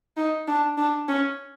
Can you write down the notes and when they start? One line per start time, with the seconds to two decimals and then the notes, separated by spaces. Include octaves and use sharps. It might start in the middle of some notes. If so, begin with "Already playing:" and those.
0.17 D#4
0.48 D4
0.77 D4
1.08 C#4